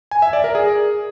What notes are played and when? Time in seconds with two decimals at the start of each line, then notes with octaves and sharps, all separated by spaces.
0.11 G#5
0.22 E5
0.33 D5
0.44 A#4
0.55 G#4